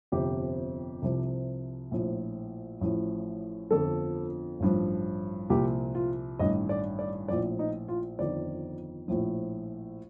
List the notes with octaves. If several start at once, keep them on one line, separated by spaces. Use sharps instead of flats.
G1 F2 C3 G4
C2 C3 F3
A#1 A2 F3
A1 A2 F3
G1 F2 D3 F3 A4
A1 G2 F3
C2 A#2 F3 G4
F4
A1 G2 D#3 D#5
D5
D5
A#1 A2 F3 D5
D#4
F4
G1 F2 D#3 D5
A#1 A2 F3